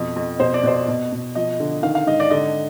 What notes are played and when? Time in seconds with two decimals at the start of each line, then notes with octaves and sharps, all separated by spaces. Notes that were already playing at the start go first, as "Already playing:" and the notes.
Already playing: F2 B2
0.16 F2
0.40 B2 C5
0.54 D5
0.63 B2 C5
0.88 B2
1.12 B2
1.35 F3 D#5
1.60 D3
1.83 D#3 F5
1.95 F5
2.07 G#2 D#5
2.20 D5
2.31 D3 D#5